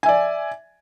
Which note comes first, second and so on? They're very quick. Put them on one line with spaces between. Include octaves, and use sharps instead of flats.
G#5 E5 D5